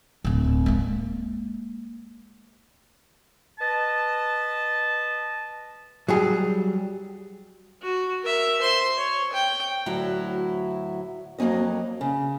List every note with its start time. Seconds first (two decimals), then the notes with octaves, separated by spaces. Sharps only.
0.25 D1 D2
0.66 G#3 A#3
3.59 B4 D#5 A5
6.08 F#3 G3 G#4
7.82 F#4
8.23 A#4 E5
8.61 C5 C6
8.98 C#5
9.33 G5
9.86 D2 A2 F#3 E4 F#4
11.39 F2 F#3 A#3 C#4 D#5
12.01 C#3